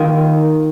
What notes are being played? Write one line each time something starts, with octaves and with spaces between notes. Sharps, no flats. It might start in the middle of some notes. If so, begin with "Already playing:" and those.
Already playing: D#3 A#3 F4